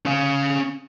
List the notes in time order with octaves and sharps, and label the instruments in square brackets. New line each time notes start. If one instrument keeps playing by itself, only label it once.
[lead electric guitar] C#4 F5